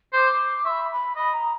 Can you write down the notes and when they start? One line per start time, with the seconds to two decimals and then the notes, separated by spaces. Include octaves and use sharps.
0.13 C5 D6
0.65 E5 C6
0.70 B5
0.92 B5
1.16 D#5 B5
1.33 A#5